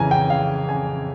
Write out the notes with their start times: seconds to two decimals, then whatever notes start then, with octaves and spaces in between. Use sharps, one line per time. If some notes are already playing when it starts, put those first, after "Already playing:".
Already playing: F2 C#3 E3 G#5 A#5
0.11 G5
0.30 F5
0.69 G#5